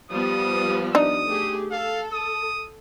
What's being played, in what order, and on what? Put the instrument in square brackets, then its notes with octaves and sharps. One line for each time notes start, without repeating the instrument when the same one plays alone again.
[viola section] F3 G3 B3 [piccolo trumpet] D#6
[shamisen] D4 D#4 [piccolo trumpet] D#6
[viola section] A3 G4 G#4
[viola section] A4 [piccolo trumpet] F5
[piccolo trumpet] D#6